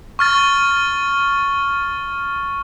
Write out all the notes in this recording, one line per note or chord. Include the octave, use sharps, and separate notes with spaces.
C#6 F6 A6